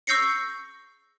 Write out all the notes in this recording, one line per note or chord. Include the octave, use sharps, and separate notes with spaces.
C#6 E6 G6 A#6 C7 C#7